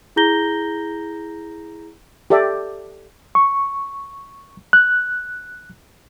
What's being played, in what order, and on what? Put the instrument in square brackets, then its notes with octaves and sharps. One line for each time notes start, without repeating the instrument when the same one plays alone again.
[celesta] E4 G#4 A#5 G6 A#6 G7
[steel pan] G4 A4 D5 E5
[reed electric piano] C#6
F#6